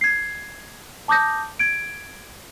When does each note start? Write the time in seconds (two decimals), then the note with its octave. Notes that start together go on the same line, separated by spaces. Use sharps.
0.01 G#6 C7
1.08 A5 D6 D#6 G6 A#6
1.59 G#6 D7